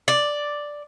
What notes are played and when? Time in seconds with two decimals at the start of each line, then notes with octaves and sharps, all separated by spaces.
0.08 D5